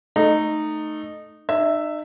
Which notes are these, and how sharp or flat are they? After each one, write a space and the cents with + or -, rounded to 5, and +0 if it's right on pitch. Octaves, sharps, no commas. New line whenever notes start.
A3 +0 D#4 -15
D#4 -40 E5 +0